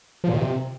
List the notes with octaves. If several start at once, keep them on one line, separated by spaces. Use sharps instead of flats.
F3
A#2
D#3
C3